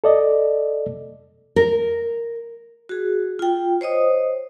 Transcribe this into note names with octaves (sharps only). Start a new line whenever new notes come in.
A4 D5 D#5
A#4
F#4 G#4
F4 G5
C5 C#5 D#5 D#6